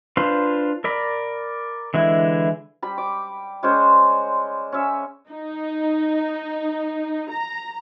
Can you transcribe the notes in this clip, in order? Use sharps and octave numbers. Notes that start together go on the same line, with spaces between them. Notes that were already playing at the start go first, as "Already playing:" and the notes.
D4 F4 B4 C5 C6
A#4 D5 B5
D3 E3 G#3 E4
G3 B5
D6
G#3 C#4 C5 D5
C#4 E5
D#4
A#5